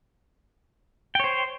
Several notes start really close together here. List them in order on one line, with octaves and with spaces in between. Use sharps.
G5 C#5 C5